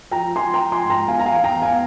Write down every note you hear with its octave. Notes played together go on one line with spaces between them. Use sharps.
F3 G5 A#5
F3 G#5 C6
G5 A#5
F3
G#5 C6
G#2
G5 A#5
E2 F5 G#5
A#5
F5 G#5
E2
G5 A#5
E2
F5 G#5